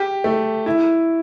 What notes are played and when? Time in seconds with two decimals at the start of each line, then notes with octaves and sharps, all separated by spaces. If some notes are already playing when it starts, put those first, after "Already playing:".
Already playing: G4
0.24 A3
0.66 E4